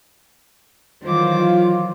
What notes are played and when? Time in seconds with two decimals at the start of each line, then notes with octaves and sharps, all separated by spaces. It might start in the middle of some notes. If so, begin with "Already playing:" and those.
1.03 D#3 E3 F#3 F4 C5 D6